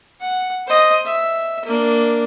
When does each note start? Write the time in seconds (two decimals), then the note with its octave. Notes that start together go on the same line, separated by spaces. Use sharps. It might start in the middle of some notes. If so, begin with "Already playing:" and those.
0.21 F#5
0.67 C5 D#5
1.06 E5
1.65 A#3 D4